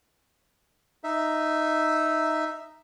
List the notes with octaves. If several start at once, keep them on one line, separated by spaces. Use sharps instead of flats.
D#4 E5